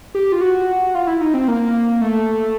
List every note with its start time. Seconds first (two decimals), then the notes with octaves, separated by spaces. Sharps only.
0.15 G4
0.32 F4
0.41 F#4
0.95 F4
1.07 E4
1.21 D#4
1.34 C4
1.48 A#3
2.01 A3